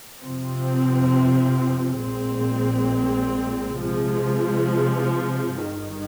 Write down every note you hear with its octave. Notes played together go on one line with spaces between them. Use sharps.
F2 C3 F3 C4
A#1 A#2 G#3 C4
C3 F3 G#3
G1 G2 D#3